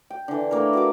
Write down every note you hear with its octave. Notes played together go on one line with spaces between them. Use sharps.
G5
D3 E3
A3 A#3 E4 A#4
F#4 B4 D6